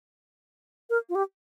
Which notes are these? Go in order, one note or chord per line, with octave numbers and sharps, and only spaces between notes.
A#4
F4
G4